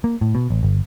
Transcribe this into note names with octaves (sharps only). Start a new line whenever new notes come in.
A#3
A2
B2
A1
G1